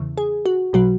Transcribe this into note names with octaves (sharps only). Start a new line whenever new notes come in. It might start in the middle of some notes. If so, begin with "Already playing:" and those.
Already playing: E2 C#3 E3
G#4
F#4
B1 B2 F#3 F#4